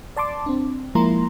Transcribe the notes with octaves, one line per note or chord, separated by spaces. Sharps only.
D5 A5 C6 D6
C4 D4
F3 G#3 A#3 E4 A#5 C6